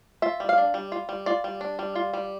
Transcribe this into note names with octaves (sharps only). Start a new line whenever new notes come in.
F4 E5
G3
F5
D4
G3
F4
G3
F4 D5
G3
D4
G3
F4
G3